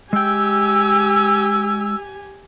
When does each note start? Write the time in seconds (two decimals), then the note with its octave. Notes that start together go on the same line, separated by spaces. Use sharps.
0.13 G#3 G4 G5 G#5 E6